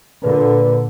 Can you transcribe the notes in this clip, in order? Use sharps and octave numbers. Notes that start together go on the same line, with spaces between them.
A#2 D3 B4